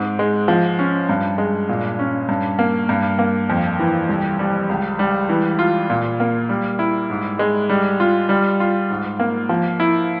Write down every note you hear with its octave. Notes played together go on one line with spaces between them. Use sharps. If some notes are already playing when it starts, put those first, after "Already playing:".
Already playing: G#2 C4
G#3
F3
C#4
G2
G#3
A#2
C#4
G2
A#3
G2
A#3
F2
E3
C2
G3
C#2
G3
E3
F4
A#2
A#3
G3
E4
G#2
G#3
G3
F4
G3
F4
G#2
A#3
F3
E4